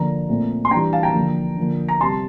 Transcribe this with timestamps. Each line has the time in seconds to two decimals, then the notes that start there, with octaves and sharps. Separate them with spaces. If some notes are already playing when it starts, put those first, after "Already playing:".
Already playing: D3 F3 A#3 A#5
0.28 A#2 A3 C4
0.65 C6
0.71 E3 G3 D4 G5 A#5
0.93 F5 A5
1.03 G5 A#5
1.14 D3 F3 A#3
1.57 D3 F3 A#3
1.89 A#5
2.01 C3 G3 C4 A5 C6